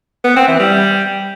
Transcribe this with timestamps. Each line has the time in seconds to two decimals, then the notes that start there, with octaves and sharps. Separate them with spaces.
0.24 B3
0.36 C4
0.48 E3
0.60 G3